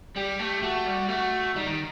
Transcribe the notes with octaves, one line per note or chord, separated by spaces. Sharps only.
G3 G4
A3
A3 F#4
G3
A3 F#4
G3 D#4
D#3